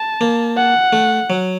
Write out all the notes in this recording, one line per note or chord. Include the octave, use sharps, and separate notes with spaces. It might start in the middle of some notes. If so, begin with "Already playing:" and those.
Already playing: A5
A#3
F#5
A3
F#3